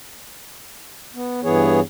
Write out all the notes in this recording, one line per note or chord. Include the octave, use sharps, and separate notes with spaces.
B3
G2 E3 B3 G#4 C#5